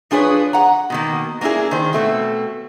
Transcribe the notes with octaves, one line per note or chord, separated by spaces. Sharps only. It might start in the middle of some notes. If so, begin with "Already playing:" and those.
F3 D4 G#4 B4 C#5
F#5 A#5
B2 D#3 A#3
A#3 B3 D4 E4 G#4
D#3 C5
B2 A3 C4